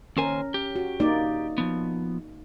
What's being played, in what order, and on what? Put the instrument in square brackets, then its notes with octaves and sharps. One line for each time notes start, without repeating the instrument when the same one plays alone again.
[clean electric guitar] D#2 C5 G#5 [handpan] C#4 A#4
[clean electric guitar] G4
[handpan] F#4
A#3 D#4 D5
[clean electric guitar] F3 B3